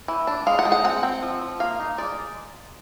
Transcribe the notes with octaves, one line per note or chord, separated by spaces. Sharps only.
E3
D4
G#3 F5
F#5
G#3
F#5
C4 F#5
C4
F3
F3
A#3 F5
D#4
G#3 D5